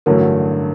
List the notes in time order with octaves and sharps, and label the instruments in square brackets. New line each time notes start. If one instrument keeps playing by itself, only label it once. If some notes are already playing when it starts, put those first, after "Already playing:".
[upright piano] A1 G2 D3 F#3 A3 [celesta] A#4